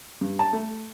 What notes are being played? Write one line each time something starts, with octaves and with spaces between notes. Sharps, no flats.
G2
A5
A3